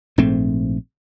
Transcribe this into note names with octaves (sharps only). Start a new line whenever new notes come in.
A#1 G#2 A3 C4